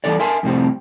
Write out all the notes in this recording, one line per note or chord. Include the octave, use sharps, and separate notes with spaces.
E2 G#2 E3 G3 A4 D5
A#4 E5 G#5 A5 C6
F2 A2 C3 G3 C4